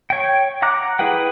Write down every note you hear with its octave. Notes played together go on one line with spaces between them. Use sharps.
C#5 G5
F#5 A#5 D6 F#6
E4 G#4 B4 F#5 G5